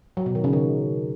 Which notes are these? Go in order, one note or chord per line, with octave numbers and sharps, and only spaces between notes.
F#3
B2
D#3
C#3
D#3